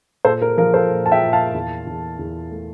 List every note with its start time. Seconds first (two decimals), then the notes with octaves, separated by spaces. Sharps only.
0.25 A#2 A4 C5
0.42 A#4
0.57 F3 A#4
0.74 A4 C5
0.90 A#2
1.06 A5
1.11 E5 G5
1.22 A#2
1.33 F5 A5
1.54 E2
1.87 E2
2.19 E2
2.51 A3